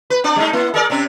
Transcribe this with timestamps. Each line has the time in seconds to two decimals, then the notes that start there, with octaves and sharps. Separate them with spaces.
0.10 B4
0.24 C4 D4 D5
0.36 G3 A3 D#4
0.53 A#3 E4
0.74 G#4 A#4 D5
0.90 C3 C4 C#4